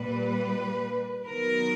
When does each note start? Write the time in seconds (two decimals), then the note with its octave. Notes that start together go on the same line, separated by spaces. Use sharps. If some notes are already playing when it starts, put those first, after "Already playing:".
Already playing: A#2 G3 A#3 B4
1.26 D#3 F#3 B3 A#4